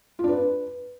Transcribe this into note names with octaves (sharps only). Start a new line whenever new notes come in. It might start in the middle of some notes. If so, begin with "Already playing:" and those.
F4
D4
B4